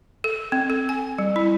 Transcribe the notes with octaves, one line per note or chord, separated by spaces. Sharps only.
A4
C4
A4
G#5
G3
E4